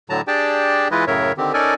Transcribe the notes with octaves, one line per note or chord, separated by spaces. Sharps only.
A2 D3 F#3 A5 A#5
D4 G4 G#4 D5 G5 A5
E3 G#3 E4 F4 B4 D#5
F#2 A2 C#3 A#4 C#5 E5
D3 D#3 C4 G4
C#4 D#4 A4 A#4 D5 G#5